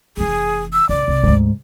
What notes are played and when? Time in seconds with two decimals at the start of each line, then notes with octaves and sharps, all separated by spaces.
0.17 F1 E3 G#4
0.73 E6
0.89 C#2 D5
1.08 C2
1.23 D2 G#2 C#3